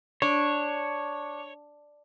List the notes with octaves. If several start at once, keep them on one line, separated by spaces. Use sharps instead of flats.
D4 C#5